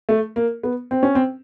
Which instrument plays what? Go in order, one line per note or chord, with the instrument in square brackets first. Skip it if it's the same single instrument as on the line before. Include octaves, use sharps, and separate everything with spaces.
[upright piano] A3
A#3
B3
C4
C#4
C4